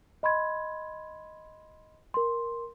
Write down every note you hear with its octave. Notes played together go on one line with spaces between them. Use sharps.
D#5 B5 C6 G#6
A#4 C6